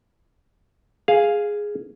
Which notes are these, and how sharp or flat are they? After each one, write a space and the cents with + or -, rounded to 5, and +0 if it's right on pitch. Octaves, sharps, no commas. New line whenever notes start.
G#4 +0 F5 +0